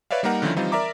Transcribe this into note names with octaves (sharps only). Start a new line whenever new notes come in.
B4 C#5 D5 E5 F5
G3 A#3 D#4 A#4 F#5
D3 D#3 F3 C#4 D#4 E4
E3 G3 C4 D#4 F4
A#4 D5 E5 A#5 D6